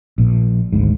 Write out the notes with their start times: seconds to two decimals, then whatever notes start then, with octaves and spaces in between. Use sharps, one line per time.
0.18 A#1 A#2
0.73 G#1 D2 G#2